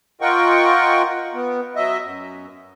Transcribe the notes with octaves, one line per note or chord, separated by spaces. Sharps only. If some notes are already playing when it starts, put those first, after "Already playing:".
F4 A#4 D#5 F#5 G5 C#6
B3
F#3 D#5 E5
F#2